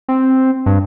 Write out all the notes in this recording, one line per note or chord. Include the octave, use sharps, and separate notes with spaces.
C4
G2